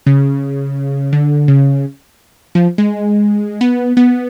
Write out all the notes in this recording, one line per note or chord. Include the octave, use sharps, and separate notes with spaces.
C#3
D3
C#3
F3
G#3
B3
B3